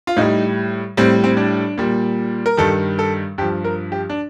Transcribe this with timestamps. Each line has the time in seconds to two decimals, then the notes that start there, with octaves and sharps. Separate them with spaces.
0.07 F4
0.17 A2 G3 D#4
0.97 A2 G3 C4
1.24 C4
1.37 D4
1.78 A#2 G3
2.46 A#4
2.57 G2 D#3 G3 A4
2.99 A4
3.38 G2 G4
3.42 F3
3.64 A#4
3.92 G4
4.09 D4